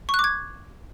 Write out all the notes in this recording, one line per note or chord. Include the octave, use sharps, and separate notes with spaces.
C#6
F#6
D6
G#6